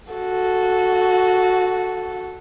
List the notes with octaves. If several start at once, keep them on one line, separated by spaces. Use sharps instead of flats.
F#4 A4